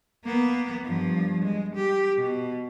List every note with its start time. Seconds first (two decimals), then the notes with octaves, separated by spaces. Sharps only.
0.25 A#3 B3
0.85 G2 F3
1.44 G#3
1.76 G4
2.17 B2